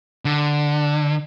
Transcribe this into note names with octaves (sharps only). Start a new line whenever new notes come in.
D3